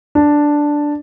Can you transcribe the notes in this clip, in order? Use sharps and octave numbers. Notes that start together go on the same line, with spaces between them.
D4